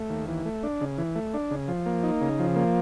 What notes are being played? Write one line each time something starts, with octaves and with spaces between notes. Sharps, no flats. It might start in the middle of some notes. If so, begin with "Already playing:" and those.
Already playing: A3
D#2
E3
A3
D4
C#3
E3
A3
D4
C#3
F3
A#3
D#4
C#3
F3
A#3